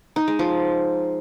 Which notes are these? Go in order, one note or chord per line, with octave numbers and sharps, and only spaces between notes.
D#4
G#3
F3